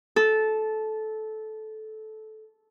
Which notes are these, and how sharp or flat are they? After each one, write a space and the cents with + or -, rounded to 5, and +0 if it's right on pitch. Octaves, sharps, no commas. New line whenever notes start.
A4 -15